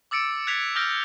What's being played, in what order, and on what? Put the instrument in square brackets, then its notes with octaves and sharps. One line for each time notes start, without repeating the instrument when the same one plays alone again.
[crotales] D6 E6 A6 C#7 D7
F#6 G#6 A6 B6 F7
D#6 F6 G6 A#6 D7